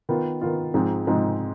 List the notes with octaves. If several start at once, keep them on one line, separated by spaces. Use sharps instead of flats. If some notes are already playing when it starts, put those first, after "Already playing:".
D#3 B3 F4
D#3 B3 F4
G#2 F3 G#3 C4 D#4
G#2 F3 G#3 C4 D#4